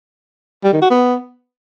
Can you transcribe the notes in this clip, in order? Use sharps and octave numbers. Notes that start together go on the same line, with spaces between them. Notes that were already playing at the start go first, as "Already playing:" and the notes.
G3
D#3
F#4
B3